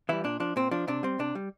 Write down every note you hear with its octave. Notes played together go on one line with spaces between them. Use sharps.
E3 G3 E4
A#2 D4
F3 D4
A#2 C4
F3 D4
C3 D4
G3 C4
C3 D4
G3